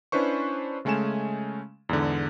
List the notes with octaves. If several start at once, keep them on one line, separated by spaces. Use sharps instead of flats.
C#4 D4 E4 B4 C5 C#6
C#3 G#3 A3 C#4 G#5 E7
E2 G#2 D3